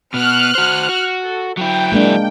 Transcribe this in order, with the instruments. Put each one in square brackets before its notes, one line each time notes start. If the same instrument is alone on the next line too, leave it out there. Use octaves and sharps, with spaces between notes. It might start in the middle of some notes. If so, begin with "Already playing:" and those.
[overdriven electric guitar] B2 B3 [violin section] F6 F#6
[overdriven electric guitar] F#4 C5
F#4
[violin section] A4
[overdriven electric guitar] F#3 E4 [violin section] G5
[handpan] G#3 A#3 D4